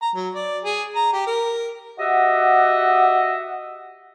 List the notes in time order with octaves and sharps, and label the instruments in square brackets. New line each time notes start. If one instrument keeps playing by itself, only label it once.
[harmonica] A#5
F#3
D5
G#4
A#5
G4
A#4
[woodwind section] F#4 G4 D#5 E5 F#5